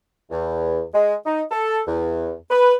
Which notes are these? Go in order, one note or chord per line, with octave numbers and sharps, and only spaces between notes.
E2
G#3
D#4
A4
E2
B4